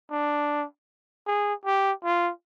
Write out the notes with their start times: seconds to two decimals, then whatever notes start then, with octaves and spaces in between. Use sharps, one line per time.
0.11 D4
1.27 G#4
1.65 G4
2.04 F4